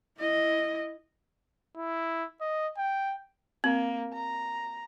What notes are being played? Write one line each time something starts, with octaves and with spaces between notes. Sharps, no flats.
E4 D#5
E4
D#5
G5
A#3 C4
A#5